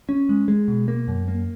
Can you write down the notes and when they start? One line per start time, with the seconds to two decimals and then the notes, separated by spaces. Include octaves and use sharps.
0.09 C#4
0.29 G#3
0.48 G#3
0.68 B2
0.88 A#3
1.08 F#2
1.28 A#3